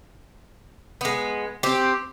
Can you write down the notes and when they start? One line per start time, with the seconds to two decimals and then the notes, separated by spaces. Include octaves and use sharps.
1.01 G#3 B3
1.63 C4 G4